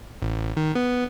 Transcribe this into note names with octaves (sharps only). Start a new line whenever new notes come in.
A1
D#3
B3